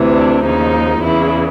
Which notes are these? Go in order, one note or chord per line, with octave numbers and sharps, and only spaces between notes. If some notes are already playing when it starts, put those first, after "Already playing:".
Already playing: D2 C3 E3
D4
D#2 C#3 F3 D#4
E2 C#3 E3 E4